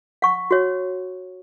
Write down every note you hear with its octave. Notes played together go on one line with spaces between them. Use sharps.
F#5 C#6
F#4 C#5